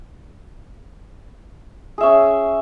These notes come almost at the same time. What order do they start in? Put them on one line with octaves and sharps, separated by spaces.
G#4 E5 C#4